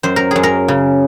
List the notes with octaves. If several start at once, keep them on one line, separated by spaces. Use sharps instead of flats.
F#2 C5
A#4
F#2 G#4
A#4
C#3